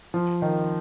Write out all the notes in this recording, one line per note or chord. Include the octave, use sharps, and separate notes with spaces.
F3
D#3